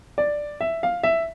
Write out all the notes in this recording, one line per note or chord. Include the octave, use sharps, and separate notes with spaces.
D5
E5
F5
E5